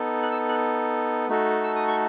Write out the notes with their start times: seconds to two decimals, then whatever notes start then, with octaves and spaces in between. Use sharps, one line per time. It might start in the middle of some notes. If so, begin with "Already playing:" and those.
Already playing: B3 D#4 A4
0.23 F#6
0.32 E6
0.49 F#6
1.28 A3 D#4 F#4 A4
1.64 E6
1.76 D#6
1.88 C#6